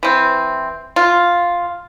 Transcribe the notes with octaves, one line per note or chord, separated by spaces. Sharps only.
E3 C4
F4